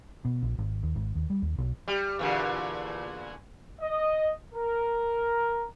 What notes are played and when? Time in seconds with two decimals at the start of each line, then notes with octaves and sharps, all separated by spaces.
0.25 B2
0.43 A#1
0.58 G#1
0.83 D#2
0.96 G#1
1.15 D#2
1.30 G3
1.42 D#2
1.58 B1
1.88 G3
2.19 E2 A#2 D3
3.80 D#5
4.53 A#4